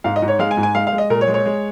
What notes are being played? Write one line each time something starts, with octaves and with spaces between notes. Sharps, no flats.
G#2 F5
D#5
G#2
C#5
G#3 F5
G#5
G#2
G#5
G#3 F5
F5
G#3
D#5
A#2 A#4
C#5
G#3
C#5
G#3